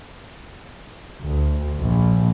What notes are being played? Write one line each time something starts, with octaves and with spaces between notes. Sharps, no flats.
D2
A#1